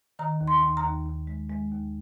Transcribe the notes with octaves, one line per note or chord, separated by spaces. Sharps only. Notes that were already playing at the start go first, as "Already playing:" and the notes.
D#3 A#5
D#2
C6
D#2
A#5
D#2
D#2
G#3
G#3
D#2